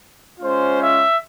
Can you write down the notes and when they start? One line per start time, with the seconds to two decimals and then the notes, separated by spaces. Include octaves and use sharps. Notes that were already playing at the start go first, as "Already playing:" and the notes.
0.40 G#3 C#4 F4 C5
0.79 E5